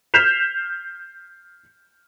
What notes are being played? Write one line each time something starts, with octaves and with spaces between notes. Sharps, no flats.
F6 G6 B6 C7 E7 F7